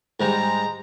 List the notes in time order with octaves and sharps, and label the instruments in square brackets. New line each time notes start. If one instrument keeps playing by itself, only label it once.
[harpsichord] G#2 G3 [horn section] G#3 A#5